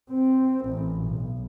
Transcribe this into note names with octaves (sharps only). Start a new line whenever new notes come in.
C4
A1
B1